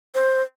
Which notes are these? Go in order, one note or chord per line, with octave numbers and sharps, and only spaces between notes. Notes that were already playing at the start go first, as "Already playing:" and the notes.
C5